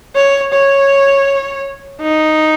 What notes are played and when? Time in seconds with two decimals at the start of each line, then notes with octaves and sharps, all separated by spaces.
0.15 C#5
0.52 C#5
2.02 D#4